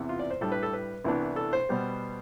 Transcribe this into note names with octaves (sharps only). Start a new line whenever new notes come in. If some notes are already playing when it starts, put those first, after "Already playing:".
Already playing: E2 C3 E3 B3
F4
D5
C5
A2 G3 D4 A4
B4
A4
B4
C2 C3 E3 B3 D4
A4
C5
B2 G3 B3